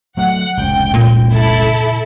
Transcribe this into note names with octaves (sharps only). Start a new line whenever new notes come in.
F#3 A3 F#5
F1 C#2 G5
A#2
E4 A4